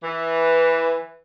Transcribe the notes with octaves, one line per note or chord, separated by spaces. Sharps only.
E3